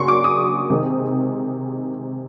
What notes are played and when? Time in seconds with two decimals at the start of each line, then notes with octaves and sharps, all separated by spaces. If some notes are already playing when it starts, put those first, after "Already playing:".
Already playing: C#3 F#3 A#3 D4 C6 C#6
0.08 D6
0.24 D#6
0.70 C3 D#3 G#3 C4